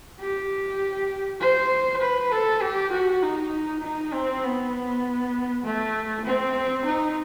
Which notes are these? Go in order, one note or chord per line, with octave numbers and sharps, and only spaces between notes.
G4
C5
B4
A4
G4
F#4
D#4
D#4
C4
B3
A3
C4
D#4